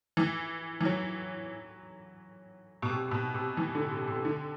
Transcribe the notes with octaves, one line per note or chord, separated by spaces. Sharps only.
E3
E3
F#3
B2
C3
C3
B2
C3
E3
D3
C3
C3
D3